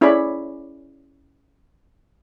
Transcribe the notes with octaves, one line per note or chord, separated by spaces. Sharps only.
C#4 E4 G#4 C#5 D5 B5